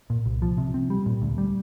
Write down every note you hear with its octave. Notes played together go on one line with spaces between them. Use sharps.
A#2
C2
F3
C3
C4
G3
A#2
D2
G3